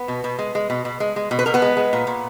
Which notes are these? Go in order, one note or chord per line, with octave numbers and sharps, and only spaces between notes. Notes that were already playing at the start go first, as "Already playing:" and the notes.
Already playing: B3
B2
B2
G#3
G#3
B2
B2
G#3
G#3
B2
B4
B2 A#4
B3 B4
G#3
G#3
A#2
A#2